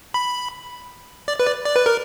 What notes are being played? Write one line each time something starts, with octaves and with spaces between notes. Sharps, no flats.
B5
D5
B4
D5
D5
B4
A#4